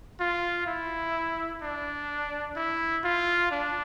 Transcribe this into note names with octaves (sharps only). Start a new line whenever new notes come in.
F4
E4
D4
E4
F4
D4